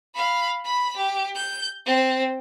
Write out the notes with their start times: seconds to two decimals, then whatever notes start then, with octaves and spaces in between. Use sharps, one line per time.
0.15 F5 B5
0.65 B5 B6
0.96 G4
1.35 G6
1.86 C4